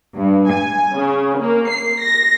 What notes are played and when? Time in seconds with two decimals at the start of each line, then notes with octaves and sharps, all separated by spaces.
0.15 G2
0.51 G#5
0.95 C#3
1.39 A#3
1.70 C7
2.03 A#6